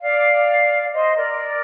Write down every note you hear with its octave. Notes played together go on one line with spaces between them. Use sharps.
D5 F5
C5 D#5
A#4 D5